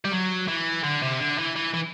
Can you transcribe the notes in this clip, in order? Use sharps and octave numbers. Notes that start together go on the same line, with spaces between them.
G3
F#3
E3
D3
C3
D3
E3
E3
E3